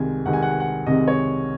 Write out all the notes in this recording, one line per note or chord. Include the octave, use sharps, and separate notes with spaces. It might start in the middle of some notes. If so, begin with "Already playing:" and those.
Already playing: C2 C3 D#3 G#3 G#5
C2 C3 D#3 G#3 F#5
G#5
F#5
G#5
F#5
C2 C3 D#3 G#3 D#5
C#5